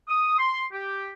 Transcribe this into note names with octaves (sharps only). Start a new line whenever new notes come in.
D#6
C6
G4